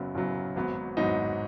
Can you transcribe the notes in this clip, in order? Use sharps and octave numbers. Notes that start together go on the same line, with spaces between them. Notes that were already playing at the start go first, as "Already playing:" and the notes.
Already playing: F#1 F#2 C#3 F#3 B3
F#1 F#2 C#3 F#3 B3
G#1 G#2 F#3 B3
G#1 G#2 F#3 B3 D#4